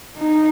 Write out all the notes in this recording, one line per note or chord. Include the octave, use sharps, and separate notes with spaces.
D#4